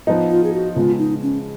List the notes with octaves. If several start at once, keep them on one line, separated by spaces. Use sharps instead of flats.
F3 B3 D#4
F4
G#4
F#4
C#3 G#3 B3 F4
D#4
C#4